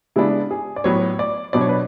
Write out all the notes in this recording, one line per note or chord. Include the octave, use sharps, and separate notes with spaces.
C#3 G#3 B3 D4 E4
G#4
D5
A2 F#3 B3 C#5
D5
B2 F#3 B3 D4 D5
C#5
B4